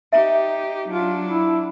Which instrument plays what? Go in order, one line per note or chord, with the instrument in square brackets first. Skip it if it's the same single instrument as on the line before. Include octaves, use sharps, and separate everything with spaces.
[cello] D#4 G4 [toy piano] E5 A#5
[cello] F#3 D4 [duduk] F4
[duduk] E4